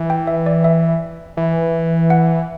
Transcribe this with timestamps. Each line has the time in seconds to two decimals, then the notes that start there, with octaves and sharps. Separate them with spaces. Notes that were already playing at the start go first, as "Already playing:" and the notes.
Already playing: E3
0.10 G5
0.27 E5
0.46 D5
0.64 E5
1.37 E3
2.10 F#5